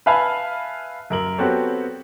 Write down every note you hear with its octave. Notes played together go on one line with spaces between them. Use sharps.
B4 E5 F5 G#5 A5 B5
F#2 A#4 F#7
B3 C4 F#4 G4 A4 C#5